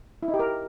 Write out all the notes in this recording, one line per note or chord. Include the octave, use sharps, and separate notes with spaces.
E4
D#4
G4
A#4